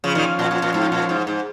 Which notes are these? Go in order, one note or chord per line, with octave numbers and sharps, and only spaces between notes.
C#3 F3 C#4 F4
A#2 D#3
A#2
A#2
A#2
G#2
A#2
G#2
G#2